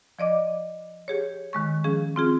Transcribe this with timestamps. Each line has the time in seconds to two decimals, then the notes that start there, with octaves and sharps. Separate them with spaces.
0.19 F3 D5 D#5 D6
1.08 G4 G#4 C#5
1.53 D#3 G#3 C#6
1.84 F3 C#4 G#4
2.16 C4 F4 G#4